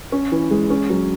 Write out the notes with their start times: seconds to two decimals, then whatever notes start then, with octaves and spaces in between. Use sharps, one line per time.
0.12 C#4
0.32 E3
0.51 G#3
0.70 C#4
0.90 F#3